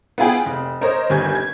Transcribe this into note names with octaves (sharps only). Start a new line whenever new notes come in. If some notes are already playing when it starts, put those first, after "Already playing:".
B3 E4 F4 G#4 G5
F1
A#4 C5 C#5 D#5
G1 D#2 G#5 G6 G#6
G#6